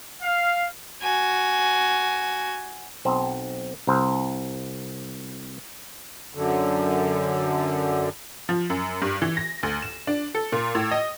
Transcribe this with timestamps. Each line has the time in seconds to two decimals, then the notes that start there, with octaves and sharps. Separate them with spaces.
0.23 F5
1.01 F#4 G#5
3.05 B1 C4
3.87 C2 C5
6.35 F#2 D3
8.49 F3
8.70 F#2
9.02 G2
9.22 E3
9.37 A#6
9.63 D2
9.82 E7
10.07 D4
10.35 A4
10.52 A#2
10.75 A2
10.91 D#5